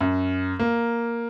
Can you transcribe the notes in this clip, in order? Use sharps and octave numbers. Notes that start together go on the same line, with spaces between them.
F#2
A#3